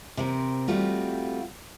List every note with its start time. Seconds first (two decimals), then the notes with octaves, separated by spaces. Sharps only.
0.17 C3 C4 A#4
0.67 G3 A3 C4 F4 F#4